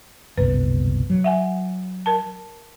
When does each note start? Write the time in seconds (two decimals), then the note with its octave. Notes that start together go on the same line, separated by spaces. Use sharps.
0.37 F#1 C2 B2 B4
1.10 F#3
1.24 E5 F#5 G#5
2.06 A#4 A5